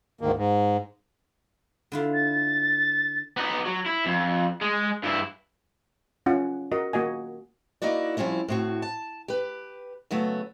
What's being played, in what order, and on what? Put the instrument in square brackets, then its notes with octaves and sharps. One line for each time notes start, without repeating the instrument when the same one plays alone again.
[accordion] D2 G#2 D#3 A#3
G#2
[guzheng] D3 E4 F4
[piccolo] A6
[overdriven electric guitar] B3 D#4
F#3
E4
F2
G#3
G2 E4
[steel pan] C#4 F4 F#5
F#4 A#4 D#5
A#3 F#4 D#5 G#5
[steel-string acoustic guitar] A#3 D#4 E4 F#4 D5
F3 G3 C4 C#4 E4
A2 C4 F#4
A5
G4 B4
C#3 F#3 A3 B3